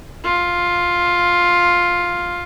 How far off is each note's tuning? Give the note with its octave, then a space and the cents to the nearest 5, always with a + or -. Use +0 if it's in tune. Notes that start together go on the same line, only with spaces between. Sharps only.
F4 +5